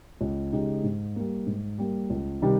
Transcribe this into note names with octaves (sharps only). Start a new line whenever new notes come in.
C#2
C#3 G#3 D#4 G4
G#2
G3 A#3
G#2
G3 A#3
C#2
C3 D#3 G3